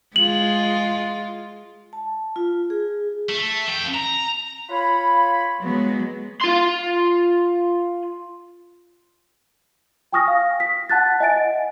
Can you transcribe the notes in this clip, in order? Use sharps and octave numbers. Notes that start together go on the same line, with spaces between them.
G#3 F4 F#7
A5
F4
G#4
A3
F2 G5
A#5
F4 C#5 B5
F#3 G#3 B3
F4 C6
G5 G#5 C#6 D#6 F6 A#6
F5
B6
F#5 A5 F#6 A6
D#5 E5 G#5 A6 D7
F#5